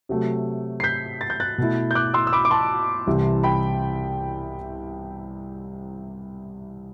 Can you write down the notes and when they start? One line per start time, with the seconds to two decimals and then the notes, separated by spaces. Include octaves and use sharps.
0.09 C3 F#3 A3
0.80 C7
0.84 G6 B6
1.21 A6
1.30 G6
1.40 F#6 A6
1.58 B2 A3 E4
1.91 G6
1.95 D6 F#6
2.14 C6 E6
2.27 E6
2.33 B5 D6
2.45 D6
2.51 A5 C6
3.07 C2 C3 E3
3.43 G5 B5